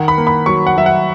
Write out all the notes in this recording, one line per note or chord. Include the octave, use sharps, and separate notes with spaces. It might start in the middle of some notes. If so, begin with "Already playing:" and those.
Already playing: D#3 F#5
B5
A#3
B5
F#3 C#6
F#5
F#3 E5
F#5